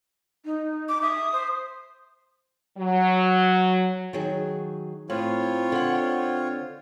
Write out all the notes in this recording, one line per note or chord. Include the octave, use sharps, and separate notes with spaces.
D#4
D6
E5 D#6
C5
F#3
D#3 F#3 G#4
A2 C4 F4 C#5
D3 F#5